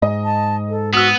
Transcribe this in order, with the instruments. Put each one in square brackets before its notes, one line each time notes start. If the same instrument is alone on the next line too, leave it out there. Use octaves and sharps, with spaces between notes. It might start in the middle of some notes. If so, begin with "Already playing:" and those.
[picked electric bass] G#2 [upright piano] D#5
[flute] A5
A4
[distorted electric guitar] B3 [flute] F#4 [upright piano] D#6 E6